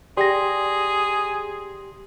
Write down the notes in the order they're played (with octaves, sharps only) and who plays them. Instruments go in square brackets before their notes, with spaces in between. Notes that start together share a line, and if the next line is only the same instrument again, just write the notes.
[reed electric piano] G4 C6 [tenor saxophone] G#4 [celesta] D5 G5 A#6